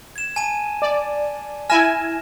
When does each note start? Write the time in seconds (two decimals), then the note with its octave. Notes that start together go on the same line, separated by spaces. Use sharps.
0.16 G#6 E7
0.36 G#5 A5 D#7
0.82 D5
1.70 E4 G#5 F6 A#6 E7